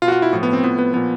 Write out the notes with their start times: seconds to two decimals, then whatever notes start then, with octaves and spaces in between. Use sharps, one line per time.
0.02 B2 F4
0.08 F#4
0.12 F4
0.22 E4
0.33 A2 F3
0.43 B3
0.53 C4
0.64 A2 F3 B3
0.79 B3
0.94 A#2 F3 B3